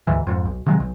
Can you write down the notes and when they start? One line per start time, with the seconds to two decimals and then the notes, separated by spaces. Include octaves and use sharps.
0.07 D2 G#2 E3
0.27 F2 G#2
0.45 B1
0.66 C3 D#3 F#3 G#3
0.80 B1